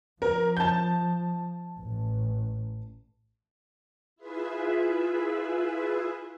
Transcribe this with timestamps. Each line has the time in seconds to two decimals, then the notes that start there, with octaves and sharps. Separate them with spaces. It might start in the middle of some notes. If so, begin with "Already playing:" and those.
0.22 F3 A#4
0.57 A5 G6
1.80 A1
4.16 E4 F4 G#4 B4 E5